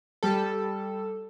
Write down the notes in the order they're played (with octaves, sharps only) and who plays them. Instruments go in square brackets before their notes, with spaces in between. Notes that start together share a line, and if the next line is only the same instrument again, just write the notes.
[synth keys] G3 A4